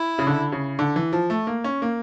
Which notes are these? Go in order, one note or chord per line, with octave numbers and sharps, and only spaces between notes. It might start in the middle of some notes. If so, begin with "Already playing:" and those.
Already playing: E4
C#3
D3
C#3
D3
E3
F3
A3
A#3
C#4
A#3